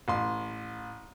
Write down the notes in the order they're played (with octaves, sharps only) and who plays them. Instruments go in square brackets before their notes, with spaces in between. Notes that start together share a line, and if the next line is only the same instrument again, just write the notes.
[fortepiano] A1 C6